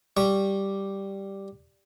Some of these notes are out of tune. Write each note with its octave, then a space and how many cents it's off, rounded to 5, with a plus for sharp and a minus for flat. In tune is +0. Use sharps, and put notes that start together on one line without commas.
G3 +0 C#6 +0